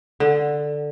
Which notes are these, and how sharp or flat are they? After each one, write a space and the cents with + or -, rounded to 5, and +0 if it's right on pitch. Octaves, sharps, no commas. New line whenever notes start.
D3 +5